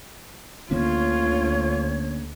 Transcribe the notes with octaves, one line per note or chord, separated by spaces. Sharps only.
D2 D3 A#3 C#4 F4 C#5